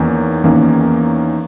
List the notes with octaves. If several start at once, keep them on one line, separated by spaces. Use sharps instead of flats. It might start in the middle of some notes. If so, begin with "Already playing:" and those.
Already playing: E2 D#3 A#3 C#4
E2 D#3 A#3 C#4